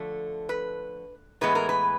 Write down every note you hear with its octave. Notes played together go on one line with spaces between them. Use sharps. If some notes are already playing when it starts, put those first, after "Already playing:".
Already playing: D3 F3 A3
B4
A2 E3 G#3 B3 B4
A#4
B4